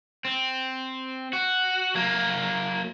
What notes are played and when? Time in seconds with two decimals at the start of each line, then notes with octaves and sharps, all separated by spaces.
0.25 C4
1.33 F#4
1.95 F#3 A#3